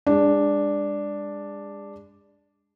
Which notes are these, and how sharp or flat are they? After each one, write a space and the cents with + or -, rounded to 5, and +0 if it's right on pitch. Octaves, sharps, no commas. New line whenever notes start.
G#3 -35 D4 +0